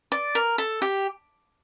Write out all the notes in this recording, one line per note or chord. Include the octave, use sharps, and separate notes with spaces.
D5
A#4
A4
G4